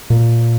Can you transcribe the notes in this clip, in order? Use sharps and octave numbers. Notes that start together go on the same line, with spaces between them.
A#2